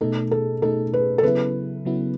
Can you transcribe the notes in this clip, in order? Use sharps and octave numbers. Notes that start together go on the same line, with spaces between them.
B2 A3 D#4 A4
A4
B2 A3 D#4 A4
B4
A4
C#3 F#3 B3 E4 B4
C#3 F#3 B3 E4